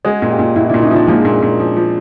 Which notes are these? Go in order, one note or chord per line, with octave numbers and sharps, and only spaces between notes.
G#3 F#4 G#4
A#2
F4 G4
A#2
A#2 E4 F#4
A#2 D4 E4
C#4 D#4
F3 C4 D4
F3 G#3 A#3
A#2
A#2
F3
F3